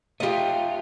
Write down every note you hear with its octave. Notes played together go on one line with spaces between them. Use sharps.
A3 F4 G4 D#5